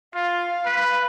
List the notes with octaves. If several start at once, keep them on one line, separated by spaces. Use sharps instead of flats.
F4 F5
B4